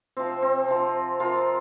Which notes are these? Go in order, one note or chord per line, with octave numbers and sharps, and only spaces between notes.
C3 F3 C4
C4
C3 F3
C3 F3 F4 A#4